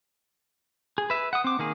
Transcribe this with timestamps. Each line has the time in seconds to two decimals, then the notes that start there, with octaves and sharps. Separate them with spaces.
0.98 G#4
1.10 B4 E5
1.33 F#5 D#6
1.44 C4 D6
1.59 D#3 A#3 G#4